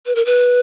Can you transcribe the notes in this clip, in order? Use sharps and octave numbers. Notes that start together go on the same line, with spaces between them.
B4
A#4
B4